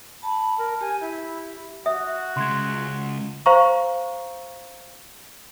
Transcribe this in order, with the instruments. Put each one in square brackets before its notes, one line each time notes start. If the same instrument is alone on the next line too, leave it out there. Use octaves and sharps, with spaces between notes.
[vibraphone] A5 [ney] B5
[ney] A#4
[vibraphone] G4 [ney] G#5
[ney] E4 [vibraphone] G4
[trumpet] F#4 [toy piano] E5 [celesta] D#6
[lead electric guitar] C#3 G#3 [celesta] C6 G#6
[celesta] C5 F5 A#5 C#6